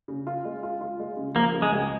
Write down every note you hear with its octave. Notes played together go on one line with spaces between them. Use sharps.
C#3
F4
G#3
F4
F4
G#3
C#3
F3 A#3
C#3
G#3
C#2